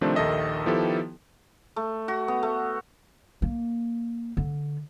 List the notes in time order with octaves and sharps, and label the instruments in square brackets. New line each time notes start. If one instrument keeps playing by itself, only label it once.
[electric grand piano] C3 D#3 F3 A3 C4 D4
A#1 D#2 D#3 A4 D#5 E5
D#3 F3 B3 E4 G4 A4
[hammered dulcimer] A3
F#4
B3
A3
[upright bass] A#3
D3